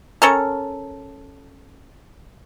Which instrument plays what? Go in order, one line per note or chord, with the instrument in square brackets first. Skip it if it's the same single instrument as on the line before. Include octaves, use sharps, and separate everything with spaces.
[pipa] C#4 A4 A#4